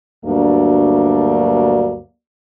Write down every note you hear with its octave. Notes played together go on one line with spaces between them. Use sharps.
D2 G2 F#3 A#3 D4